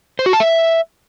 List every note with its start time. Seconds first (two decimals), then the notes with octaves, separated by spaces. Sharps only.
0.19 C5
0.26 F#4
0.33 A5
0.40 E5